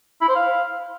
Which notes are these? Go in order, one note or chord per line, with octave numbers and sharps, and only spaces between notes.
E4
C5
F5